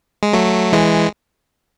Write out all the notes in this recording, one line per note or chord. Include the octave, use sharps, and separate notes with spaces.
G#3
F#3 A3
E3 G#3